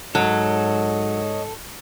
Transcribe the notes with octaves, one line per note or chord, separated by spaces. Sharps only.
G#2 F#3 A4 C#5 D#5